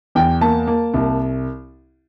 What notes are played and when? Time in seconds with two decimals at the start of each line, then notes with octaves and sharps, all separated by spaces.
0.15 E2 G5
0.41 A#3 A5
0.67 A#3
0.94 C2